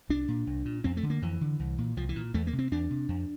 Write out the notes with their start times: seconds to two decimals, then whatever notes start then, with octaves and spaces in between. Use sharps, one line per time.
0.09 C2 D4
0.28 A#2
0.47 C2
0.65 A#2
0.84 F2 C4
0.97 A3
1.03 D3
1.10 A#3
1.22 F2 E3
1.41 D3
1.60 C2
1.78 A#2
1.97 C2 F3
2.09 E3
2.16 A#2
2.34 E2 A3
2.47 A#3
2.53 C3
2.59 C4
2.71 E2 D4
2.90 C3
3.09 F2